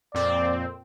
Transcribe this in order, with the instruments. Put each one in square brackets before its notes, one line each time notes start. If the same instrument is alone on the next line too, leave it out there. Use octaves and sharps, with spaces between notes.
[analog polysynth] F2 A#2 C4 [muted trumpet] D5